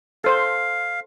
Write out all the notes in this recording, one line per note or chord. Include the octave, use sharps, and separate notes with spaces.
A4 C5 F5 C6